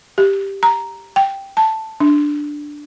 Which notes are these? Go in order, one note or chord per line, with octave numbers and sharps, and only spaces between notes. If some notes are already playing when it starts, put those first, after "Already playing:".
G4
A#5
G5
A5
D4